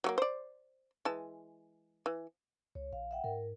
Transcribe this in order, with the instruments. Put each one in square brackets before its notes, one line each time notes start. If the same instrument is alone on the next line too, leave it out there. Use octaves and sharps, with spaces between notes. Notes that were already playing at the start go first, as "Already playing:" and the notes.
[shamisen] F#3 A3 A#3
C5 D5
E3 G#3 A5
E3
[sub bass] C#2 [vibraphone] C#5
[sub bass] A#1 [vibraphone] F5
[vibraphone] E5 F#5 G5
[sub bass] G#2 [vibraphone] A#4